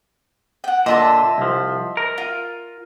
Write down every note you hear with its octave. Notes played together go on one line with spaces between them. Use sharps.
F#5 G5
A#2 D3 D#5 E5 A5
C2 F3
A#4
F4